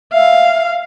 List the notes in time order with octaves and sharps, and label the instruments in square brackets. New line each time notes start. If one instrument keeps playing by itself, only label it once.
[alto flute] E5 [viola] F5